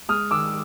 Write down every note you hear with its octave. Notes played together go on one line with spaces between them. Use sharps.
G#3 D#6 F6
D#3 D6 E6